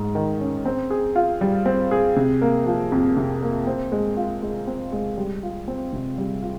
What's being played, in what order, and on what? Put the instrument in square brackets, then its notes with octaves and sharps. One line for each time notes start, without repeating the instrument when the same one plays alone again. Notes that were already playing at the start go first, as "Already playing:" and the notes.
Already playing: [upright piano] G#2 G#3
D#3
C#4
C4
G#4
F4
G3
C4
G#4
C3
A#3
F3
F2
C3
A#3
C4
G#3
F4
G#3
C4
G#3
G3
F4
C4
C3
G3
F4